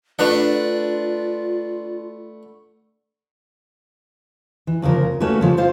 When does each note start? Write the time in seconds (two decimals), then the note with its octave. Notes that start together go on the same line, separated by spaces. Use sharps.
0.19 A3 D4 F4 B4 F#5
4.67 E3
4.82 D2 C#3 F3 A#4
5.20 A3 A#3 C#4 F#4 B4
5.41 C#3 F3 G3
5.57 F4 C5 F5